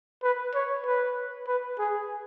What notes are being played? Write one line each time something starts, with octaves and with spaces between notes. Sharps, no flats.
B4
C#5
B4
B4
G#4